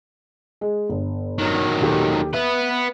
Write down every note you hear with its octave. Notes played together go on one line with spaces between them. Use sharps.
G#3
G1
D#3 F#3
D#2 G4 A4
B3 B4 E5